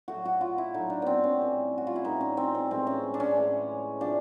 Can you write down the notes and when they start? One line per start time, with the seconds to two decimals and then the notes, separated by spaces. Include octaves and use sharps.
0.08 A2 F#3 A3 F#4
0.25 F#4
0.41 F4
0.58 E4
0.74 A2 F#3 A3 D#4
0.90 D4
1.02 B3 C4
1.24 C#4
1.39 A2 E3 G3
1.78 F#4
1.87 F4
1.96 E4
2.05 A2 E3 G3 D#4
2.21 C#4
2.37 C4
2.55 C4
2.70 A2 E3 G#3 C4
2.87 C#4
3.14 D4
3.20 C#4
3.36 A2 E3 G#3
4.01 C3 F3 A3 D4